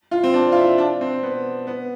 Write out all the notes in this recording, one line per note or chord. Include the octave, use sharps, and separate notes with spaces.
F4
C4
D4
F4
E4
D4
C4
B3
B3